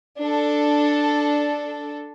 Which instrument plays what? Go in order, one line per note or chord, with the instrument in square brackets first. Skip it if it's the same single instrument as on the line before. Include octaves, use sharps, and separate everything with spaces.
[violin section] D4 A4